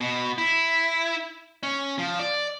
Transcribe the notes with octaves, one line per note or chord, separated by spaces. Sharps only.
B2
E4
C#4
F3
D5